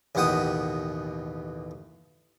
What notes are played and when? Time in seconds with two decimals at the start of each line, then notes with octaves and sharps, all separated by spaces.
0.15 A1 D#2 B2 F#5 G5 D#6